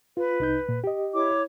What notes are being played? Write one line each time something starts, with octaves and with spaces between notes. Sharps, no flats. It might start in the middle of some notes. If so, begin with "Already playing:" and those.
F4 B4
C2 D#4 G6
A#2
G4 D#5
E4 C#5 D6